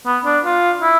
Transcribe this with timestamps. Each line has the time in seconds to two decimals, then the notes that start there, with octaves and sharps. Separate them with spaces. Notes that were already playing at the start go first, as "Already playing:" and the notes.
0.06 B3
0.25 D4
0.45 F4
0.82 E4